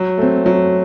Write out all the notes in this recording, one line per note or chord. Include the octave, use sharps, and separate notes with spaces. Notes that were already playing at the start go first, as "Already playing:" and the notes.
Already playing: F#3
A3 C4
F#3